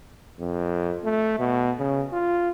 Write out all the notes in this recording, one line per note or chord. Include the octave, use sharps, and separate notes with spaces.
F2
A3
B2
C#3
F4